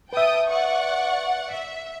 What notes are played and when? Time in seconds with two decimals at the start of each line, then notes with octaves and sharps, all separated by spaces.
0.13 B4 E5 G5 A5 D#6
0.50 D5 F#5 C#6
1.54 E5